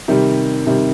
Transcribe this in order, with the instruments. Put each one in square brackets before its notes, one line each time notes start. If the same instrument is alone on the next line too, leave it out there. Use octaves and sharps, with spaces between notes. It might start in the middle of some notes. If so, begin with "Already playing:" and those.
[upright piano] C3 D#3 G3
C3 D#3 G3